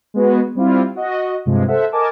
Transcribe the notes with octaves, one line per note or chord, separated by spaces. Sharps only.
G#3 B3 F#4
G3 C4 E4 F4
F#4 D#5
G2 C3 F3 G#3
A4 C5 E5 F#5
A#4 D#5 G#5 A5 D6